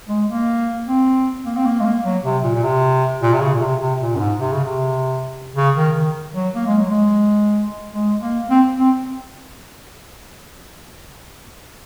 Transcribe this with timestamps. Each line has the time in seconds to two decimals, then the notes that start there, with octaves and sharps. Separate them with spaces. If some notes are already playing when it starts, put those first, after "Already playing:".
0.09 G#3
0.28 A#3
0.87 C4
1.46 A#3
1.57 C4
1.65 A#3
1.81 G#3
1.85 A#3
2.04 F#3
2.24 C3
2.44 A#2
2.55 A#2
2.64 C3
3.22 A#2
3.33 C3
3.41 C#3
3.54 A#2
3.61 C3
3.81 C3
4.01 A#2
4.16 F#2
4.20 G#2
4.39 C3
4.52 C#3
4.64 C3
5.56 C#3
5.76 D#3
5.96 D#3
6.35 F#3
6.55 A#3
6.67 G#3
6.78 F#3
6.91 G#3
7.91 G#3
8.21 A#3
8.50 C4
8.79 C4